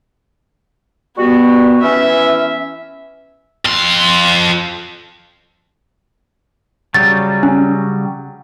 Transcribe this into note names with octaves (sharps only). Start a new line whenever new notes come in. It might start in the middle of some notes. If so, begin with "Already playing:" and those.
G3 B3 F#4
E3 C#4 E5
F2 C6
C#3 F#3 G3 A6
C#4